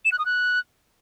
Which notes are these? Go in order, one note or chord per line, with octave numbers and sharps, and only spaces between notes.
E7
F#6
D#6
F#6